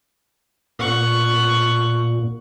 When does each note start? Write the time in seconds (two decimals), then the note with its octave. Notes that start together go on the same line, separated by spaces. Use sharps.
0.79 A#2 F#5 C#6